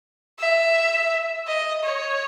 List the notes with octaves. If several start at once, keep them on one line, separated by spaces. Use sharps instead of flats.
E5
D#5
C#5